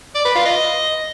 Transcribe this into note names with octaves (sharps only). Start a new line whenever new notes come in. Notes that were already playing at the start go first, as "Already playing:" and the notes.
D5
B4
F4
D#5